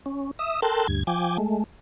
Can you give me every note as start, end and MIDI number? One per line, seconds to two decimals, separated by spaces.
0.06 0.31 61
0.39 0.61 76
0.39 0.61 87
0.62 0.87 69
0.62 0.87 70
0.62 0.87 79
0.62 0.87 81
0.62 0.87 84
0.62 0.87 90
0.88 1.03 38
0.88 1.03 43
0.88 1.03 92
1.07 1.37 53
1.07 1.37 79
1.07 1.37 80
1.07 1.37 86
1.38 1.64 56
1.38 1.64 57